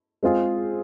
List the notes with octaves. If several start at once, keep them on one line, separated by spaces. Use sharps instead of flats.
G#3 C4 F4 G#4